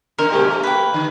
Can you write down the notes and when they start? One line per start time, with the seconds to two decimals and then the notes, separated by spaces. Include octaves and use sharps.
0.18 C#3 A#4
0.32 A#2 G#3 G4
0.48 A3
0.63 B4 G5
0.94 D3